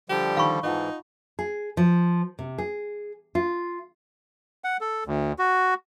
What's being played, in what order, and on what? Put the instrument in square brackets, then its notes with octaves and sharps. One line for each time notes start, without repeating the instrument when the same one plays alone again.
[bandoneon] D3 F3 G3 [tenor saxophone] G4
[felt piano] D#3 [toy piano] F5 B5 C#6
[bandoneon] G#2 E3 [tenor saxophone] D#4 [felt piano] F4 F#5 A5
[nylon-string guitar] G#4
F3
C3
G#4
F4
[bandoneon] F#5
A4
D2
F#4